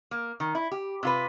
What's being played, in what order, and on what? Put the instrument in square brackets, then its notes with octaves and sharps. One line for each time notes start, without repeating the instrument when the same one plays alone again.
[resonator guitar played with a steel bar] A#3
D#3
E4
G4
C3 F4 B4